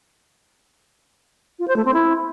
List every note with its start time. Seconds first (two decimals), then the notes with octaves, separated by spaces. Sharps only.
1.59 F4
1.68 C5
1.76 A3
1.85 C4
1.94 E4